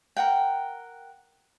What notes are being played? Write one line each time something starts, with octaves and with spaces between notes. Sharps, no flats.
A#4 F#5 G5